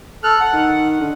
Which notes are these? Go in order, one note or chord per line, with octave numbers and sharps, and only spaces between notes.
A4 F6 F#6
F#5
D#3
D3